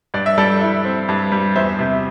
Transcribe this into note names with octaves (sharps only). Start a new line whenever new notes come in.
G2 D5
E5
G3 A4 D5
E4
C4
G2
G3
E2 C5 E5
C3